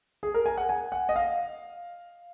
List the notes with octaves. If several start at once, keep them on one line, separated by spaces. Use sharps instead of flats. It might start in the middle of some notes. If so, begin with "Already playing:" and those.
G#4
A#4
G#5
F#5
G#5
F#5
D#5
F5